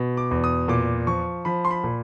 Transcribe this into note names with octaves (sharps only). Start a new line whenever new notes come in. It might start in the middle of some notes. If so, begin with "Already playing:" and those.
Already playing: B2
D6
E2
D#6
A#2 D6
F3 C#6
F3 B5
C6
B5
A#2